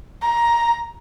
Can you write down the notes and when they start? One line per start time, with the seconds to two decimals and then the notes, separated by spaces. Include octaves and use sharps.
0.22 A#5